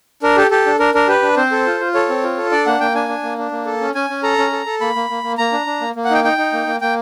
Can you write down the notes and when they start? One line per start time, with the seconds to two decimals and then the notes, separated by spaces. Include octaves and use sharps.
0.23 D4 A#4
0.37 G4 A4
0.51 G4 A4
0.66 D4
0.79 D4 A#4
0.94 D4 A#4
1.08 G4 B4
1.22 D4
1.37 C4 C5
1.51 A4
1.66 F4
1.81 F4
1.95 A4 C#5
2.09 C4
2.23 F4
2.37 A4
2.51 D4 D5
2.66 A#3 F#5
2.80 A#3 G5
2.94 D4 G#5
3.09 D4
3.23 A#3
3.38 D4
3.51 A#3
3.66 A4
3.81 C#4
3.95 C#4 G#5
4.10 C#4
4.23 A4 A#5
4.38 C#4
4.52 A4
4.66 A4
4.81 A#3 B5
4.95 A#3
5.10 A#3
5.24 A#3
5.38 A#3 A#5
5.52 D4
5.66 D4
5.81 A#3
5.95 A#3
6.05 F#5
6.10 D#4 G5
6.24 D#4 G5
6.38 D#4
6.53 A#3
6.67 A#3
6.81 A#3 G5